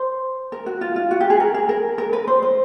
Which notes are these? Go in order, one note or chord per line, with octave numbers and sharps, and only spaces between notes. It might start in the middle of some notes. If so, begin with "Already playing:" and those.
Already playing: C5
A#4
F#4
F4
F4
F#4
G4
G#4
A#4
G#4
A#4
A#4
B4
C5
C5